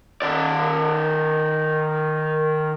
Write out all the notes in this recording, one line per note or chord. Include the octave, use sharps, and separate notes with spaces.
D#3 D5